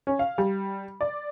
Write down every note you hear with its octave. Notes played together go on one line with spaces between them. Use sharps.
C#4
F5
G3
D5